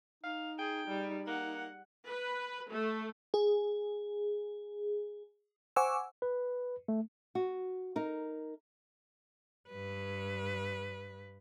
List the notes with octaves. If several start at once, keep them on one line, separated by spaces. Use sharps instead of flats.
D#4 F5
G#4 G5
G3
A#3 F#5
B4
A3
G#4
C5 F#5 G#5 C#6 D6 E6
B4
A3
F#4
D#4 A#4
G2 B4